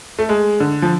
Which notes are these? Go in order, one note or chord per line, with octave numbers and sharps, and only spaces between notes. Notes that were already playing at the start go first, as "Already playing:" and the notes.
A3
G#3
D3
F3